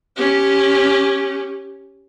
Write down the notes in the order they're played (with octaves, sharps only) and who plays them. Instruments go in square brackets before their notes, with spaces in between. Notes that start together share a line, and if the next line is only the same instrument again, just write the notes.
[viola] C#4 G4